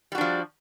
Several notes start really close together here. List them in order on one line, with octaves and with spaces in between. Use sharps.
G3 F#4 D4 F3